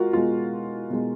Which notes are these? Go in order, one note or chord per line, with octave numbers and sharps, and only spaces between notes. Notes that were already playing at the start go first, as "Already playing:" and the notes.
Already playing: G#3 F4 F#4 A#4
B2 G#3 F4
B2 G#3